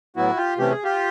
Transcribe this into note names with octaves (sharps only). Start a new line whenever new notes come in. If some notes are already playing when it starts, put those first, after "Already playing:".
A2 F#3 B3 E4 F#4
F4 G4
C3 E3 A3 C#4 G4
G#4
F4 G4